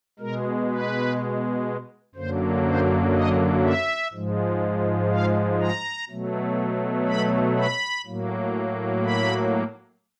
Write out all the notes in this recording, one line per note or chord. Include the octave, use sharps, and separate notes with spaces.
B2 G#3 A#4
B4
F#2 D3 F#3 A#3 C5
C5
D#5
E5
G#2 F3 G#3
F5
A#5
B2 F#3 A3
B5
B5
A2 F#3 A#3
B5